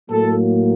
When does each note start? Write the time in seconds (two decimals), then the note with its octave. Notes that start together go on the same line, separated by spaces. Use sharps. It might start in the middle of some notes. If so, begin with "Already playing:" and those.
0.11 A2 F#3 A#3 A4